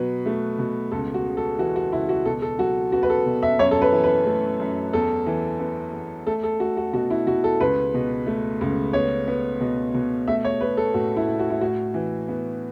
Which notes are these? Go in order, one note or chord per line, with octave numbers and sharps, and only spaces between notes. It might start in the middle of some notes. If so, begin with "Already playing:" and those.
Already playing: B2 F#3 B4
A3
B2
C#2 A4
F#4
C#3
A4
E3 F#4
F#4
C#2 E4
F#4
B2 A4
A4
F#3 F#4
B3 F#4
B4
A4
B2
E5
F#2 C#5
A4
B4
E3
B4
A3
F#2
E2 A4
E3
B3
E2
A3 A4
A4
A3 F#4
F#4
B2 F#4
E4
B2 F#4
A4
C#2 B4
B2
A3
C#2
B3 C#5
B3
B2
B2
A3 E5
C#5
A3 B4
A4
A2 F#4
E4
A2
F#4
E4
A2 F#4
E3
B3